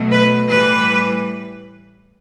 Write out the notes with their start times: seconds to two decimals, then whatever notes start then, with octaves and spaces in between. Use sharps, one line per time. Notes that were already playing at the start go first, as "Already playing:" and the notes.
Already playing: B2 F#3 A3
0.10 B4
0.48 A2 E3 G3 B4